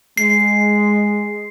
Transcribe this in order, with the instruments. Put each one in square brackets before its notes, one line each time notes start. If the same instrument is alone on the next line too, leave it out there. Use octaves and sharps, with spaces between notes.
[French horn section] G#3 [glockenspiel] C7